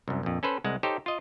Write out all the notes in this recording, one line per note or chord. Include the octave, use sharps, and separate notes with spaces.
C2 F#2
A#1 F2
C#4 A4 B4 C5
C2 G#3 F#5
D#4 G4 A4 C5 C#5
F4 D#5